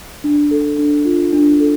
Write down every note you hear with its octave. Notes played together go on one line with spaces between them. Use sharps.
D4
A4
D4
F4
D4
A4